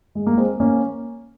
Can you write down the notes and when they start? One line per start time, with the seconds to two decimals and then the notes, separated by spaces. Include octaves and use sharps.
0.15 G#3
0.27 A#3
0.37 G#3 C4
0.60 A#3 C#4